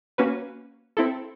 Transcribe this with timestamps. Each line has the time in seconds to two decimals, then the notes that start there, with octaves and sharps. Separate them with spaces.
0.18 A#3 C#4 F#4 B4
0.97 C4 E4 A4